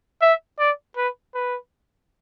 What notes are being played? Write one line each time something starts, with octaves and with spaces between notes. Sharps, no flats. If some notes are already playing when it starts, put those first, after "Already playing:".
E5
D5
B4
B4